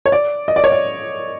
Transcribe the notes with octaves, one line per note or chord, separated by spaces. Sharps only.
C#5
D5
D#5
D5
C#5
D5